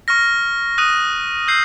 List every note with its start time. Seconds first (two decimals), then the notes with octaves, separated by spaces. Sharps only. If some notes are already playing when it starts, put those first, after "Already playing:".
0.08 C#6 F6 A#6
0.78 D#6 F#6 A#6 D#7
1.48 E6 G6 C7